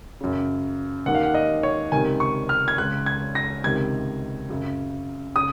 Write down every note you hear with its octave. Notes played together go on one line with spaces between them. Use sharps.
F#2 C#3
D#2 D#3 F#5
F5
F#5
D#5
C#5
C#2 C3 D#3 G#5
C#6
F6
G#6
C#2 C#3 F#6
G#6
A#6
C#2 C3 D#3 G#6
F#2 C#3
C#3 D#6